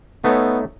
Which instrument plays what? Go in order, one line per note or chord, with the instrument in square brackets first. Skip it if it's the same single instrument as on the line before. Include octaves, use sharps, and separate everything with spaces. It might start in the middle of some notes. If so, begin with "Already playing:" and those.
[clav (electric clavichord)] A3 D#4 A4 C#5 [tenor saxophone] B3